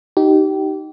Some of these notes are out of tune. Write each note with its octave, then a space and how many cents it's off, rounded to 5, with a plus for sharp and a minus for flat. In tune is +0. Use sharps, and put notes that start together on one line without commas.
D#4 +0 G4 -30